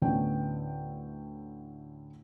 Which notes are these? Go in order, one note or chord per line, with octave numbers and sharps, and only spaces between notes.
D2 A2 D3 B3 C#4 G5